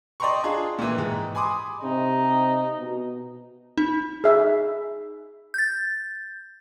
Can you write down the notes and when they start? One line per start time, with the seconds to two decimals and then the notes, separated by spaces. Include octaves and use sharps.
0.20 D5 D#5 G5 A#5 C6 C#6
0.44 D4 F4 G#4
0.78 A#2 D#3 E3
0.98 G#2
1.35 G#5 B5 C6 D6 D#6
1.83 C3 D#4
2.78 B2
3.78 D#4
4.24 G#4 E5
5.54 G6 A6